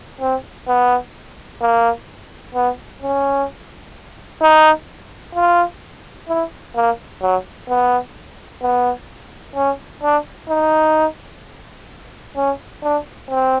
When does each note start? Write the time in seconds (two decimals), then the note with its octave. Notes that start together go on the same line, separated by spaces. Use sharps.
0.21 C4
0.68 B3
1.62 A#3
2.55 B3
3.02 C#4
4.42 D#4
5.35 F4
6.28 E4
6.76 A#3
7.22 F#3
7.69 B3
8.62 B3
9.56 C#4
10.03 D4
10.50 D#4
12.36 C#4
12.83 D4
13.30 C4